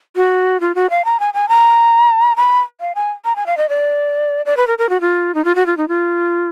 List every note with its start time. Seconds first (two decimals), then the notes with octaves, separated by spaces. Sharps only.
0.16 F#4
0.60 F4
0.75 F#4
0.90 F5
1.05 A#5
1.20 G#5
1.34 G#5
1.49 A#5
2.36 B5
2.80 F5
2.95 G#5
3.25 A#5
3.36 G#5
3.46 F5
3.57 D#5
3.69 D5
4.46 D5
4.57 B4
4.67 A#4
4.78 A#4
4.89 F#4
5.01 F4
5.34 D#4
5.44 F4
5.55 F#4
5.66 F4
5.77 D#4
5.88 F4